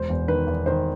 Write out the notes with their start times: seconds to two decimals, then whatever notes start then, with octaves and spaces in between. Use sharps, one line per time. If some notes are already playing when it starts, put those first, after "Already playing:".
Already playing: E1 C5
0.09 E2
0.28 D#3 B4
0.47 E2
0.66 D#3 C5